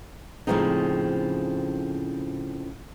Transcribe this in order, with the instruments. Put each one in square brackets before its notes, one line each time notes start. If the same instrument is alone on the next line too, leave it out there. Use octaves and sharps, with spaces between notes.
[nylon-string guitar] A2 C#3 F3 G#3 C4 D#4